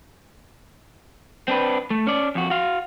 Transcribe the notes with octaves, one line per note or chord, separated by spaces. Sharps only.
C4 D4 B4
A3
C#4 D5
F2 F#4
F#4 F5